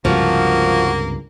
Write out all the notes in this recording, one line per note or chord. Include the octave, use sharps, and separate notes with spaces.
C#2 G2 C3 F3 A#3 F#4